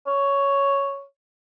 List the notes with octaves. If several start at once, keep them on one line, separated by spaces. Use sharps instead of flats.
C#5